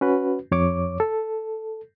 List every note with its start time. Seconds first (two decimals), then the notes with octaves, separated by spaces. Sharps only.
0.01 C#4 F#4 B4
0.51 F2 C#5 D6
1.00 A4